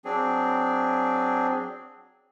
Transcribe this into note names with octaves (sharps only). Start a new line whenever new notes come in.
F#3 C4 D4 G#4